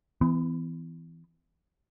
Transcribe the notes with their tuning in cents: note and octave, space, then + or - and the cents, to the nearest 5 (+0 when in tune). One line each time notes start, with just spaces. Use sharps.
E3 +0 B3 +40